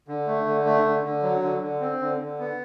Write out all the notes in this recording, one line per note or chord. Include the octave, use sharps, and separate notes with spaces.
D3
A3
D3
A3
D3
D3
F#3
D3
D3
C4
D3
D3
B3